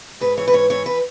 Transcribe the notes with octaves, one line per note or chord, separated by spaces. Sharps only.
G#2 B4
E3 C#5
B4
G#2 C#5
E3 C#5
B4